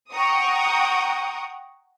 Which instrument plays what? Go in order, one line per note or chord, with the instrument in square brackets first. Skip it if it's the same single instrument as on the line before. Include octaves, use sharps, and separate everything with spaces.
[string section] F#5 G5 A#5 C#6 D#6